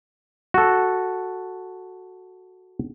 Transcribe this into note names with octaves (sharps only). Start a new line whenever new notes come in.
F#4 A4